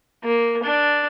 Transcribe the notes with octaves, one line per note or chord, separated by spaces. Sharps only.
A#3
D4